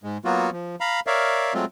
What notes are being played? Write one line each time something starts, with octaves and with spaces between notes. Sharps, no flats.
G#2 G#3
F#3 A#3 B3 F4 F#4
F3
F5 A#5 B5
A#4 C#5 D5 E5 F5
F#3 G#3 A3 C4 F4